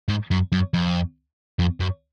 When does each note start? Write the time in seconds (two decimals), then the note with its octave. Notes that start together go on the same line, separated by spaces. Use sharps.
0.08 G#2
0.31 F#2
0.52 F#2
0.74 F2
1.59 F2
1.80 F#2